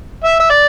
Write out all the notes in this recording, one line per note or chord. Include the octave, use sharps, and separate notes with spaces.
E5
E5
D5